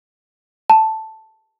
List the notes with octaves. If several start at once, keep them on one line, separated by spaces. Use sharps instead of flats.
A5